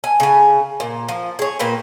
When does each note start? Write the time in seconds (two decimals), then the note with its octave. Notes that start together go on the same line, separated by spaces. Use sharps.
0.04 G#5
0.20 C#3 G#5
0.80 A#2
1.08 F3
1.39 G#4 C#5
1.59 A#2 A#3 B4 G5